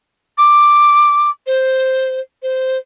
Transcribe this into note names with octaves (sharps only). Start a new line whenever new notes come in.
D6
C5
C5